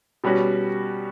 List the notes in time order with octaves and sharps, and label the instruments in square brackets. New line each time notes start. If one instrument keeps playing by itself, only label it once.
[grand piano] B2 G3 C#4 F#4